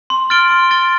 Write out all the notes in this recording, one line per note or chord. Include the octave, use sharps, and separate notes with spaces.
C6
F6 A6 D7 G7
C6
F6 A6 D7 G7